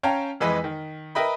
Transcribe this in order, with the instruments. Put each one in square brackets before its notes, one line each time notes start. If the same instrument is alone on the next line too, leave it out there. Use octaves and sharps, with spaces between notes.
[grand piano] C#4 C#5 F5 G5 A5 A#5
F2 E3 G#3 B4 D#5 B6
D#3
A#4 B4 D#5 E5 G5 B5